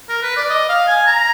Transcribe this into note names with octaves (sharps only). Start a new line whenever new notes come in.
A#4
B4
D5
D#5
F5
G#5
A#5